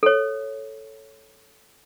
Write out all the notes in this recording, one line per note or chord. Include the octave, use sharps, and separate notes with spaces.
A4 C#5